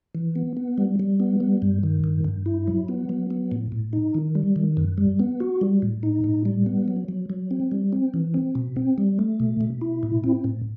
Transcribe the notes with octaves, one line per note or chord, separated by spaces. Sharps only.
E3
B3
B3
G3
G3
B3
G3
G2
D#3
G2
G2
E4
F#3
B3
F#3
B3
A2
A2
D#4
D#3
G3
D#3
F#2
G3
B3
F#4
G3
A2
D#4
A2
G3
B3
F#3
F#3
F#3
C4
G3
C4
E3
C4
B2
C4
G3
A3
B2
B2
E4
A2
C4
A2